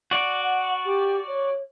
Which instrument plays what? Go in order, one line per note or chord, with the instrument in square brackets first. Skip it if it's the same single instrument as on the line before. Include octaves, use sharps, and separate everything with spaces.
[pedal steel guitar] F#4 D5
[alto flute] F#5
G4
C#5